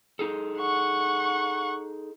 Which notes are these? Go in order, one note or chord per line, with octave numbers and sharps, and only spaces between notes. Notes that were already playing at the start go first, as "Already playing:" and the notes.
D#4 G#4 A4
F#5 C#6